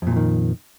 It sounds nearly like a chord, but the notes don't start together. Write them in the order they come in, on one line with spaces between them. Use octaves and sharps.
F2 A#2 F3 D#3